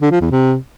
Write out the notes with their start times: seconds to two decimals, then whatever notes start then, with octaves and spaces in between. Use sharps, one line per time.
0.02 D3
0.12 F3
0.21 E2
0.31 C3